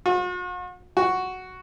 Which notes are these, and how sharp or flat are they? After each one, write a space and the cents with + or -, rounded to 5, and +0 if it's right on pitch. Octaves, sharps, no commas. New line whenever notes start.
F#4 -45
F#4 +0